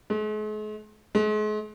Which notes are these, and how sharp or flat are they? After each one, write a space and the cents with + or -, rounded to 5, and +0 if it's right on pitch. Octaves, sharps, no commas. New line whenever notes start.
G#3 +45
G#3 +40